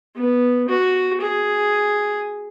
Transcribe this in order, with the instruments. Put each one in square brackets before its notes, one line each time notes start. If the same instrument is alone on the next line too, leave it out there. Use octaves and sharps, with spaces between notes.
[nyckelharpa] B3
F#4
G#4